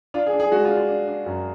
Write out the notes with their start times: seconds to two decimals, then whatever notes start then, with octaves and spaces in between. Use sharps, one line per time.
0.14 D4 F4
0.26 G#4
0.33 D4
0.40 G#4
0.51 G#3 F#4
0.65 F4
0.71 D4
0.77 F4
0.89 D4
1.08 D4
1.26 F#2